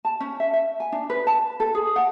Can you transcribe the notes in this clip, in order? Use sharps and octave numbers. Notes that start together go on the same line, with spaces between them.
A5
C#4
E5
E5
G#5
D4
B4
A5
A4
G#4
F#5